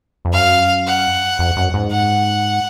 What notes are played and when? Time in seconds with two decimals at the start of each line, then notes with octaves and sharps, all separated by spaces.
0.25 F2
0.33 F#2 F5
0.87 F#5
1.39 F2
1.57 F#2
1.74 G#2
1.92 F#5